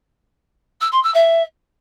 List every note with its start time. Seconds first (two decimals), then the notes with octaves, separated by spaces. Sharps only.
0.81 E6
0.92 C6
1.03 E6
1.14 E5